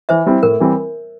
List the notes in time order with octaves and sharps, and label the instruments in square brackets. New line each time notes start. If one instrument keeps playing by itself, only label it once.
[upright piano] E3 [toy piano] C5 E5
[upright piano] G3 C4 E4
[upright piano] A2 [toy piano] A#4
[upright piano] E3 G3 C4